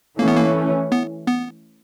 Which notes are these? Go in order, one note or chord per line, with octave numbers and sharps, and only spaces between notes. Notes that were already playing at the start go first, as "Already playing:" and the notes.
E3 A3 A#3 C#4
B3
A#3
B3
B3